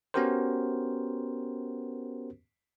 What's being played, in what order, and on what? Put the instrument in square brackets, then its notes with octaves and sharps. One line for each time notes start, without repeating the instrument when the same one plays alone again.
[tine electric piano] B3 C#4 F#4 G4 A#4 C5